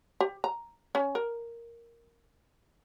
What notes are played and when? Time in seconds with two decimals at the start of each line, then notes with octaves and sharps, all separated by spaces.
0.21 G4
0.44 A#5
0.95 C#4
1.15 A#4